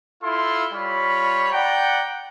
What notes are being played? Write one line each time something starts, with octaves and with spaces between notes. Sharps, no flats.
E4 F4 A4 C6
G3 F4 C#5 B5
D5 F#5 G5 A#5